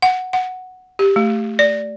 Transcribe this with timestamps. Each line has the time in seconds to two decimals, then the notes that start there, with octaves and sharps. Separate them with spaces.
0.02 F#5
0.33 F#5
0.99 G4
1.16 A3
1.59 D5